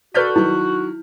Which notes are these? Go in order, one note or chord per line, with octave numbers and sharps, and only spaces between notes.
F#4 A4 B4 D5 F6 G6 B6
D#3 F#3 E4